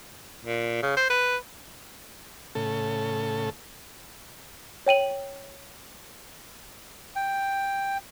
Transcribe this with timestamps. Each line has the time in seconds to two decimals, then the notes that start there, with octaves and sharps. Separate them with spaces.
0.45 A#2
0.83 C#3
0.97 C5
1.10 B4
2.55 A2 C#3 A4
4.86 C#5 G5 D#7 F#7
7.16 G5